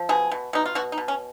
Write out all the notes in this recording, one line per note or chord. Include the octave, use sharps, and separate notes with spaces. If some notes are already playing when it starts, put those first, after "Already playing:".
Already playing: F3
B2 G#4
B2
B2 D#4
F4
B2 F#4
D#4
B2
C#4